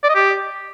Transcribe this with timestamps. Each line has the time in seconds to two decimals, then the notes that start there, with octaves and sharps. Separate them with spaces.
0.04 D5
0.09 D#5
0.15 G4